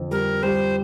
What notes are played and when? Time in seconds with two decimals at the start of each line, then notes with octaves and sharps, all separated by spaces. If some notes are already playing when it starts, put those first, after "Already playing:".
Already playing: F2 D3
0.11 G3 A#4
0.43 G3 C5